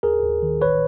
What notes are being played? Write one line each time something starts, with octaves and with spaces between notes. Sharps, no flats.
D#2 G#4 A#4
D#2
D#3
A1 B4 C#5